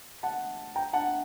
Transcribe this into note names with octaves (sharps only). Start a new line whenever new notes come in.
F#5 A5
G5 A#5
F#5 A5